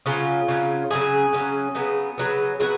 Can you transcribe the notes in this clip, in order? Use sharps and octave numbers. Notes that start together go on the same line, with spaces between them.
C#3 F#3 C#4 F4
C#3 F#3 C#4
C#3 F#3 C#4 G#4
C#3 F#3 C#4
C#3 F#3 B3
C#3 F#3 B3
C#3 F#3 B3 F#4